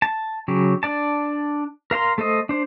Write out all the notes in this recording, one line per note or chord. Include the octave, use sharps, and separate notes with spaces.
A5
C#3 F#3 G4
D4 D5 A5
A#4 F5 A#5 C6
A3 A4 C5 D#5
D4 C5